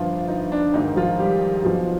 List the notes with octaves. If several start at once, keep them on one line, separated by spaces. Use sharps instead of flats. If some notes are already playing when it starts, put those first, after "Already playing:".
Already playing: G1 G2 F3 F4
D#4
D4
G#1 G#2 D#3 D#4
F3 F4
G3 G4
B1 B2 F3 F4